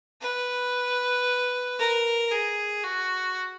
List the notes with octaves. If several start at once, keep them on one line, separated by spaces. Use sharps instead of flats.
B4
A#4
G#4
F#4